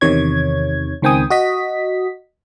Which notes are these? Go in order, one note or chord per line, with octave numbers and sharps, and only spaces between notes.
E2 C3 D#3 C#5 G#6
C#2 D#3 C4 G5 G#5 D#6
F#4 D#5 B6